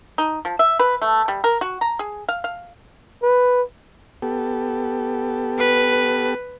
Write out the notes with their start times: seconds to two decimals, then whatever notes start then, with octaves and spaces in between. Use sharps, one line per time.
0.18 D#4
0.45 F3
0.59 E5
0.79 B4
1.02 A3
1.28 G3
1.44 A#4
1.61 F#4
1.81 A#5
1.99 G#4
2.29 F5
2.44 F5
3.23 B4
4.22 B3 G4 A4
5.58 B4